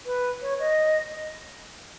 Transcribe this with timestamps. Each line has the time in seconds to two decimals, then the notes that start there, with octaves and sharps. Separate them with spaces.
0.06 B4
0.42 C#5
0.59 D#5